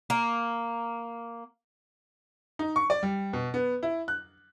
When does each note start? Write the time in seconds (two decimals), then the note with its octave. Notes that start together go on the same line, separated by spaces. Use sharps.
0.10 A#3
2.59 D#4
2.76 C#6
2.90 D5
3.03 G3
3.33 B2
3.54 B3
3.83 E4
4.08 F#6